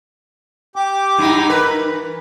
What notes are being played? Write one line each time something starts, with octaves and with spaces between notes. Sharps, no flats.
G4 G5 D6
G2 D#4 E4
A#4 B4
E3